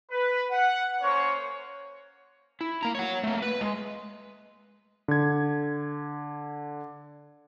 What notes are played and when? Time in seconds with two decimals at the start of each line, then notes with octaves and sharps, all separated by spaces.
0.11 B4
0.51 F#5
1.01 A#3 C#4 C5 C#5
2.61 E4
2.83 A#3 A#5
2.95 C#5 F#5
3.23 A3 A#3
3.42 B4
3.61 G#3
5.08 D3 G#6